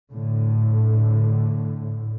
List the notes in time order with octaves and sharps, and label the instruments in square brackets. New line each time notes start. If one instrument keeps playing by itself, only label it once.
[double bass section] A2 D3